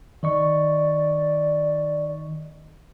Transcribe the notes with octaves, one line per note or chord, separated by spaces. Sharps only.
D#3 D5 D#5 C#6